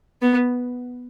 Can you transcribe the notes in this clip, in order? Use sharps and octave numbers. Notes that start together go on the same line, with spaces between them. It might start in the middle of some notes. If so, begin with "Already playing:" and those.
B3